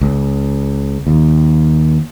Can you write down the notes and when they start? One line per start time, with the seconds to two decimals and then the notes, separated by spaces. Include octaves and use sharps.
0.01 C#2
1.07 D#2